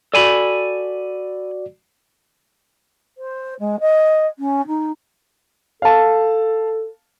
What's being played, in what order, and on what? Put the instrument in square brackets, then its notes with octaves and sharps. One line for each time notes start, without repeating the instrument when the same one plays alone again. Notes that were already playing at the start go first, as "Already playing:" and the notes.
[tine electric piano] F#4 D5 [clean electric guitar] A4 G#5 B5
[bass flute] C5
G#3
D#5
C#4
D#4
[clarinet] A4 [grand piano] F5 A5